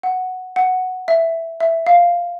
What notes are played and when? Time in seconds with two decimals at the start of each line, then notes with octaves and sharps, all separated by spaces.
0.03 F#5
0.56 F#5
1.08 E5
1.60 E5
1.87 F5